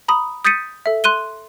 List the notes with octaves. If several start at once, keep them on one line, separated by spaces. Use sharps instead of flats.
A#5 B5 D#6
D#6 G6 A6 B6 C#7 D#7
A4 E5
C6 F#6 D#7 G7